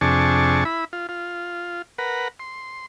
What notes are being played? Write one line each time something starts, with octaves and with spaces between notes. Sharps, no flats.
F2 C3 D4 G#4 A5 C#6
E4 B5
F4
F4
A#4 B4 F#5
C6